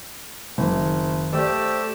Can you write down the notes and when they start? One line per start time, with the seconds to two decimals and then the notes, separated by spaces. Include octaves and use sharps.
0.58 F#1 D#3
1.33 A3 G4 C5 D5 E6